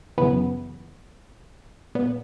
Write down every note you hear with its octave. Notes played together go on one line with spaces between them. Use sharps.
F#2 C#3 E3 B3
A#2 B3